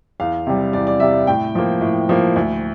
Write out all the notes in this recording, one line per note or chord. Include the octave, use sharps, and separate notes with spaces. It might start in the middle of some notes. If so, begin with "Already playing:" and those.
E2 F5
C3 G3
E2 D5
D5
C3 G3 E5
A2 G5
F3 A#3
A2
F3 A#3
D2